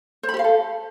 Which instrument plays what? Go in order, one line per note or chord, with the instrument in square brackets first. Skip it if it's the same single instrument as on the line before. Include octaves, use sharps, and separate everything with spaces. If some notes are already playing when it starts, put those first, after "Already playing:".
[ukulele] C5
B5
G4
F5
A4